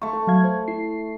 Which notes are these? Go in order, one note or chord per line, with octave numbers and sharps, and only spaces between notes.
A3 C#6
A4
F#3 F5 G#6
C5
E4 C7